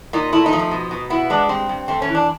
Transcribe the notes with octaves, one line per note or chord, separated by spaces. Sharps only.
A#2 D#4
A3 E4
D#4
F3
D#4
B2
B2
B3 E4
G#3 D4
G2 C4
G2
A3 C4
C#4
E3
D4